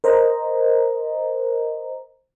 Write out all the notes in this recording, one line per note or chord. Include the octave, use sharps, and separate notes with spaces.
A#4 C5 D#5 A#5